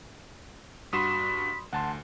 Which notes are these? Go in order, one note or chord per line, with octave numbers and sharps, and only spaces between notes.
G2 F#4 B5 C6 D#6 B6 E7
D2 F#5 A5 C6